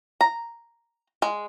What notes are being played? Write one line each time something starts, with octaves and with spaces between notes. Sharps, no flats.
A#5
G#3